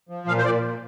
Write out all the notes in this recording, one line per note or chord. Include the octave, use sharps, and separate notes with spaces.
F3
A#2 F5
C5
A#2 D5
A#2